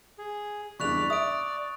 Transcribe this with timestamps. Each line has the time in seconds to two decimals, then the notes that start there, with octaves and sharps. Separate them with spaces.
0.18 G#4
0.80 F#1 E2 G2 D5 B5 C#6 F#6 F7
1.10 D5 E5 D#6 D7